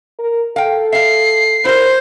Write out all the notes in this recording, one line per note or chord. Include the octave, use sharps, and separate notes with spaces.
A#4
A4 F5 G5
E5 F5 C7
E4 A#4 C5